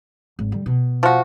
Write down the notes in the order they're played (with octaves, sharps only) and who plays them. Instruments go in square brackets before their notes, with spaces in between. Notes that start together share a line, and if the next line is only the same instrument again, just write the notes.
[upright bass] G#1
D3 G3
B2
[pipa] F3 F#4